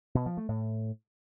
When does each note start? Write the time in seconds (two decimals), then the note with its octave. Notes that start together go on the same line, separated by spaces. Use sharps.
0.15 B2
0.26 F3
0.37 A3
0.49 A2